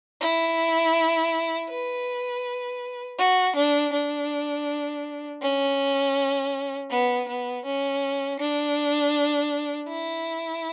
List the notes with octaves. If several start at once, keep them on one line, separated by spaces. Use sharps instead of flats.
E4
B4
F#4
D4
D4
C#4
B3
B3
C#4
D4
E4